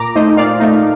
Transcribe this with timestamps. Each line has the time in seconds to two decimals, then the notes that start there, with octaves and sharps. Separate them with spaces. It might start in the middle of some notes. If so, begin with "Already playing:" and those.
Already playing: A#2 A#5 D6
0.16 A3 D#4 C5 D#5
0.37 A#2 D5 F5
0.60 A3 D#4